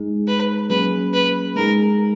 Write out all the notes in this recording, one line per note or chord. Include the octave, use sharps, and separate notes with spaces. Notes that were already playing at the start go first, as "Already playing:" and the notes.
Already playing: G#3 D#4 G#4
B4
F#3 A#3 C#4 G#4 B4
B4
G#3 D#4 G#4 A#4